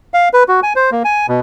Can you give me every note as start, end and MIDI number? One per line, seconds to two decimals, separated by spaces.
0.14 0.29 77
0.33 0.43 71
0.48 0.60 66
0.63 0.73 80
0.76 0.90 72
0.92 1.03 58
1.05 1.26 80
1.28 1.40 47